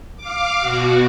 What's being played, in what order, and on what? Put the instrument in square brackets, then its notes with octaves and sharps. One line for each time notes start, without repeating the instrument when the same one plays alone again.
[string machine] F5 D6
B2 F#4